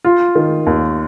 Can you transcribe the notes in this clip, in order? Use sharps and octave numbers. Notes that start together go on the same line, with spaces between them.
F4
D#3
D#2